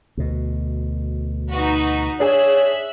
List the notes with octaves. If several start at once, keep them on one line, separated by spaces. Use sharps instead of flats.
D2 B2
D#4 F#4 B4
D4 G#4 C#5 E5 F#6